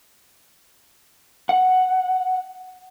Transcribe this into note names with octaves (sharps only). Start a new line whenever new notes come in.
F#5